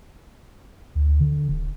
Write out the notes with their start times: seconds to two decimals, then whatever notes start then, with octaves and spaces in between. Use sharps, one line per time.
0.95 D2
1.20 D3
1.49 D1